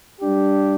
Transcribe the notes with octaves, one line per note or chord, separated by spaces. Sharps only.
G3 D4 G4